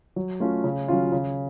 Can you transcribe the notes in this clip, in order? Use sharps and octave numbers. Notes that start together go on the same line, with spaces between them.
F#3
A3 C#4 F4
C#3
F#3 C#4 F4
C#3